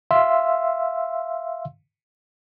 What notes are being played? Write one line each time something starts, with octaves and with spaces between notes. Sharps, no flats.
E5 F5 C6 E6